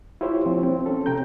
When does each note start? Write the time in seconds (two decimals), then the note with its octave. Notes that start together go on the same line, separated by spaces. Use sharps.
0.21 E4 F4 G4 C5 C#5
0.46 F3 C4
0.63 C4
0.86 C#4 A4
1.06 C3 G5 A#5 G6